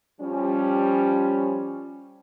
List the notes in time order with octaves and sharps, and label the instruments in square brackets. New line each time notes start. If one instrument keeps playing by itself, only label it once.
[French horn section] F3 G3 C#4